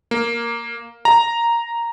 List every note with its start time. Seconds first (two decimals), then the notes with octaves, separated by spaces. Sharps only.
0.11 A#3
1.05 A#5